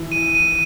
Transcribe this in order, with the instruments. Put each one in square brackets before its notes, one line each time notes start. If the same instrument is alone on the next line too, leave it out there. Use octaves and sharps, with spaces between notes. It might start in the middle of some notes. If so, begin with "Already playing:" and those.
Already playing: [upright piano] E3
[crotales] D#7
D#7